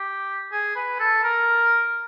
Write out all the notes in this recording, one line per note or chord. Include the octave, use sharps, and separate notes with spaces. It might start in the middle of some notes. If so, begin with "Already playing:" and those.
Already playing: G4
G#4
B4
A4
A#4